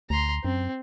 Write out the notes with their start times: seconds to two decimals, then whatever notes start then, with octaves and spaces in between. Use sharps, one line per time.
0.10 D2 A#5 C6
0.45 F#2 C4